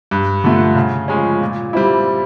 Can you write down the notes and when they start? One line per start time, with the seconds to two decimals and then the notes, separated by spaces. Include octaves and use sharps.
0.11 G2
0.44 D3 F3 A3
0.75 C#3
1.08 F3 G#3 C#4
1.41 A#2
1.73 G3 C4 E4